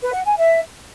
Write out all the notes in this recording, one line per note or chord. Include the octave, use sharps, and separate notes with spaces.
B4
F#5
G#5
E5